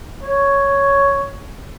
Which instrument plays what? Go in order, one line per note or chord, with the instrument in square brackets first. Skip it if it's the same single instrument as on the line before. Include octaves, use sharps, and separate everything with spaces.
[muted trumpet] C#5